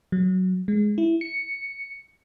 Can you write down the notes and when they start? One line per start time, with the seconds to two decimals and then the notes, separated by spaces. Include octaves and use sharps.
0.12 F#3
0.68 G#3
0.98 E4
1.21 C#7